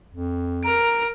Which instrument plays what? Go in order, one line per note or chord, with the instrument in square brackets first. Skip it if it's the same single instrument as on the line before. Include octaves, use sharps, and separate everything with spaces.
[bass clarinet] F2
[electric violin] A#4 D7 [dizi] A#5